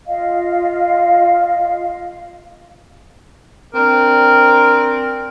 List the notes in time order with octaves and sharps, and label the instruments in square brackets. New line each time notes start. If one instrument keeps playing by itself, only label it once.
[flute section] F4 D#5 F5
[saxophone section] C4 D4 A#4